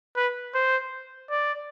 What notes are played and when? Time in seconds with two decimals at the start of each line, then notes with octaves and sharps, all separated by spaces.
0.16 B4
0.54 C5
1.30 D5